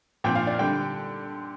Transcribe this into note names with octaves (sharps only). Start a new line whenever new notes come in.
A#2 F3 C4 G5
F5
D5
D3 G3 C4 G5